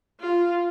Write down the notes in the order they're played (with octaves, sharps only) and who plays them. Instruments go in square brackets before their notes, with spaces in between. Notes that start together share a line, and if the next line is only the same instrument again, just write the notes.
[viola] F4